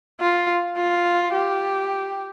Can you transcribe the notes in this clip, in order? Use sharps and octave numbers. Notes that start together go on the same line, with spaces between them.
F4
F4
G4